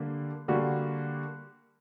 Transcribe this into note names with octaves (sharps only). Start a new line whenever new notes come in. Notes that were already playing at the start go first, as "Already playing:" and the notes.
Already playing: D3 G3 A#3 D4
D3 G3 A#3 D4 F#4